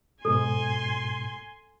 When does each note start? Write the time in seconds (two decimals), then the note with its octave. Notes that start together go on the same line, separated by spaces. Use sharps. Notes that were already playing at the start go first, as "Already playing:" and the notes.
0.25 G#2 B2 A4 G#5 C6